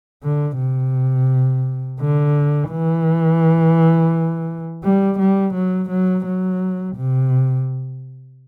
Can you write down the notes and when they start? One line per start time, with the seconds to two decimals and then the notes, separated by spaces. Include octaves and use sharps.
0.23 D3
0.58 C3
2.01 D3
2.71 E3
4.84 G3
5.19 G3
5.54 F#3
5.89 F#3
6.25 F#3
6.96 C3